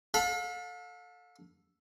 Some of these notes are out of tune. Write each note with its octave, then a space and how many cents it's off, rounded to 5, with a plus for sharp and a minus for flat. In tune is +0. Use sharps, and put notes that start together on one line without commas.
A4 +0 F5 +40 B5 +0